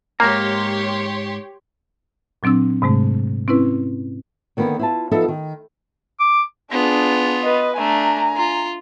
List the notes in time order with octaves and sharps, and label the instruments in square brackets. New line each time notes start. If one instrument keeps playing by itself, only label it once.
[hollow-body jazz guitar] G#2 A#5 [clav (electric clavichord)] A#3 [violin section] G4 C#5 C6
[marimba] A#2 F#3 C4 D4 E6
G#2 C3 G#3 A3
C4 C#4 E4 B4
[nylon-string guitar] D3 D#3 A#3 B3
E4 F4 A5
F3 B3 D#4 A4 E5
D#3
[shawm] D6
[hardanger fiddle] B3 F4 [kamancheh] D4 G#4
[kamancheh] B4 D#5
[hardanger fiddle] A3 D4 [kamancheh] G#5 A#5
[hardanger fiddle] F4